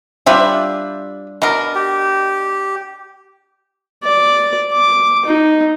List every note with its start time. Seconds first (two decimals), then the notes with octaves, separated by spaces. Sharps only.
0.26 G3 D4 F4 G4 D5 E5
1.42 B2 D4 A#4 D#5
1.75 G4
4.04 D5
4.72 D6
5.26 D#4